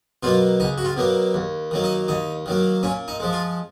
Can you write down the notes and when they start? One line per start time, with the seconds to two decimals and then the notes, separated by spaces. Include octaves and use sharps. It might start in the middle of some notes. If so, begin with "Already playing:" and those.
0.23 B2 F#3 A#3 F4
0.60 C#2 D#4
0.78 F#4
0.85 F4
0.97 B2 F#3 A#3
1.34 D#2
1.71 D#3 F#3 A#3
1.84 D#4
2.08 D#2 D#4
2.46 D#3 F#3 A#3
2.83 A#2 C#4
3.08 D#4
3.20 F3 G#3
3.33 F4